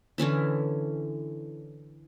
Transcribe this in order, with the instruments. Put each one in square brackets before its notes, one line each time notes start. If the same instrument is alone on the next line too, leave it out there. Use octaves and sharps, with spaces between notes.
[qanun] D3 E3 C#4 E4